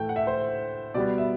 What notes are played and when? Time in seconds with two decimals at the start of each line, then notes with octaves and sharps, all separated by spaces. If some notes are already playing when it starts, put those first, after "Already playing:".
Already playing: A2 E3 A3 G5
0.09 F#5
0.16 E5
0.27 C5
0.94 B2 G3 B3 D5
1.18 E5